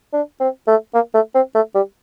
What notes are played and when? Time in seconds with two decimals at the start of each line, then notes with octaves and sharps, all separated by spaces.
0.13 D4
0.40 C4
0.67 A3
0.94 A#3
1.14 A3
1.35 C4
1.55 A3
1.75 G3